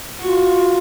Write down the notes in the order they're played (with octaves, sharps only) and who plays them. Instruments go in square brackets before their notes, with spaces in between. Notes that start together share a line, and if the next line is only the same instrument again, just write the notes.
[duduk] F4 [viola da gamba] F#4